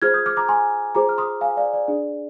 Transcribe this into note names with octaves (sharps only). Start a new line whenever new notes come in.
F4 G#4 C5 F6 G#6
D#6 G6
D6 F6
A#5 D6
G#5 C6
F4 G#4 C5 A#5 D6
F6
C6 D#6
F5 G#5
D5 F5
D5
D4 G#4 D5